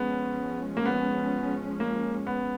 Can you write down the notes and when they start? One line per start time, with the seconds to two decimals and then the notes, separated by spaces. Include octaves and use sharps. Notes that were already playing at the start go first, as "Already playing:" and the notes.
Already playing: F3 G#3 B3 C#4
0.77 A#3
0.86 B3
1.80 A#3
2.27 B3